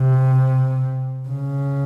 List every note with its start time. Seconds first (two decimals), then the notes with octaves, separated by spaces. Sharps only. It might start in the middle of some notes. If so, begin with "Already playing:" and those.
Already playing: C3
1.28 C#3